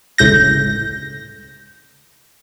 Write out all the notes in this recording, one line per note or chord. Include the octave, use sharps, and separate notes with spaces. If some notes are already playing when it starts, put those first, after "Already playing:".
G1 C#2 A2 G6 A#6